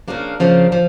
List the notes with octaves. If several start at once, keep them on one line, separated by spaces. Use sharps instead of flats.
C#3 F3 A#3 D4
C#3 F3 A#3 D4
F3